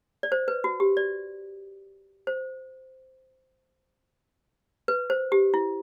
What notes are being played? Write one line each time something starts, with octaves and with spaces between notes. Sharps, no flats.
D5
C5
B4
F#4
G4
D5
C5
B4
C5
G4
E4